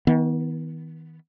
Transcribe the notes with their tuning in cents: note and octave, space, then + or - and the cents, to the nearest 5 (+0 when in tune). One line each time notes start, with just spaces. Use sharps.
D#3 +45 B3 +0